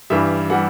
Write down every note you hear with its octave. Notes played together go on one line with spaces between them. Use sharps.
G2 E3 G3 E5
E3 G3 F#5